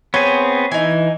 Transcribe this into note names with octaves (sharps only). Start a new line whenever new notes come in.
B3 C4 G#4 C#5
E3 D#4 G#5